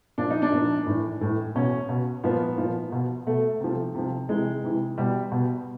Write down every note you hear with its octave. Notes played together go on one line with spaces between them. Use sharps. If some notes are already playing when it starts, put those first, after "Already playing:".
A#2 F3 D4
D#4
D4
A#2 F3
A2 E3
A2 E3
B2 C#4
B2
A#2 F3 B3
A#2 F3
B2
B2 A3
C3 F3
C3 F3
C3 E3 G#3
C3 E3
B2 G3
B2